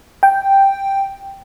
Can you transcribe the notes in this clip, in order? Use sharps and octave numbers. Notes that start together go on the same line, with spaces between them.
G5